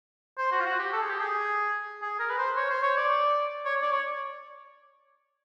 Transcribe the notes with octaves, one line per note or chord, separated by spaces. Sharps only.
C5
F#4
F4
F#4
G4
A4
G#4
G4
G#4
G#4
A#4
B4
C5
C#5
C5
C#5
D5
C#5
D5
C#5